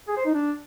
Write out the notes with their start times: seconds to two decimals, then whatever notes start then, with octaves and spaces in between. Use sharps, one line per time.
0.08 G#4
0.17 C5
0.26 D#4
0.34 D4